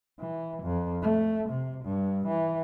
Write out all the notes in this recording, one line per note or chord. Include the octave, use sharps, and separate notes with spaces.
E3
F2
A3
C3
G2
E3